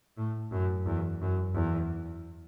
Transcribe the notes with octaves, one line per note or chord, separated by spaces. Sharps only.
A2
F#2
E2
F#2
E2